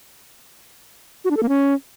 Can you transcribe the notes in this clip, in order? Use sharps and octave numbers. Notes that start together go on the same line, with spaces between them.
F#4
D4
A4
A#3
C#4